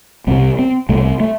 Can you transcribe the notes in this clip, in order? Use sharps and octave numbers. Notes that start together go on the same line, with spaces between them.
C2 C3 C4
C4
C2 C3 A3
A3